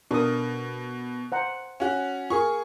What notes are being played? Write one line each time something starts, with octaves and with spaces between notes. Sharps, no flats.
B2 D4 A#4 D#6
C5 F#5 A#5
C#4 F#4
F4 G#4 A#4 C#6